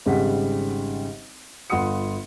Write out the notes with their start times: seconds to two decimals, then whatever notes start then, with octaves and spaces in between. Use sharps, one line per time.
0.06 G#1 C#3 G3 F#5 B6
1.70 G1 F4 F#5 B5 D#6 C#7